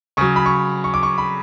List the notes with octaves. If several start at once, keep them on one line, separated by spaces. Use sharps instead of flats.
C#3 F#3 C#6
B5
C#6
C#6
D6
C#6
B5